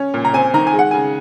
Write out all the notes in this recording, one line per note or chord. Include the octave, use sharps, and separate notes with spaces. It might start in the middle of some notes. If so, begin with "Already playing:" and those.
Already playing: C#4
A#2
A#5
C4 G#5
D#3 A#5
G#5
G#3
F#5
C#3 G#5